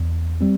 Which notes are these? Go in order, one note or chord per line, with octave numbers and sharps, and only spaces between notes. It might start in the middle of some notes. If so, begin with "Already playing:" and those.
Already playing: E2
G3 C4